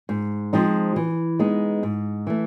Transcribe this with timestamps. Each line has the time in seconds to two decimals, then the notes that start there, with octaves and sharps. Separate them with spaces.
0.09 G#2
0.53 F3 G#3 C4 D#4
0.96 E3
1.39 G#3 B3 D#4
1.83 G#2
2.27 E3 A3